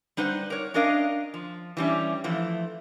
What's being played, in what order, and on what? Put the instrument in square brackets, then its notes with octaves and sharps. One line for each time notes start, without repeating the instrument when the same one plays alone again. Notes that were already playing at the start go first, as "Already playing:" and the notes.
[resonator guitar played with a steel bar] G3 D#4 B4 C5 F#5
A#4 C#5
C#4 D4 A#4 D#5 F5
F3
E3 G3 C#4
E3 F3 A3